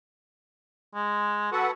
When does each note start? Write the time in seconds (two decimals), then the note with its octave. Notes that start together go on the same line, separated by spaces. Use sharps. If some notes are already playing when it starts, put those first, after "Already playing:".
0.95 G#3
1.52 F#4 A4 B4 F#5